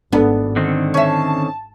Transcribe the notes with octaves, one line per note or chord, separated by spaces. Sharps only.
G#1 B3 D4 A4
D3 D#3 C4
C#4 E5 A5